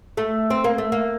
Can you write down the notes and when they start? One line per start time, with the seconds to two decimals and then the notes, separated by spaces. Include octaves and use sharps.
0.17 A3
0.50 C4
0.64 A#3
0.78 A3
0.92 A#3